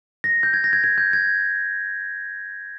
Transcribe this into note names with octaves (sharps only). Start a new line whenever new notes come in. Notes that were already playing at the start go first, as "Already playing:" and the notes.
A#6
G6
G#6
A#6
G#6
G#6
G6
G#6